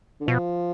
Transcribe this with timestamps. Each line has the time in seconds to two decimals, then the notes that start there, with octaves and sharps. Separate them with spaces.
0.21 D3
0.27 B2 F3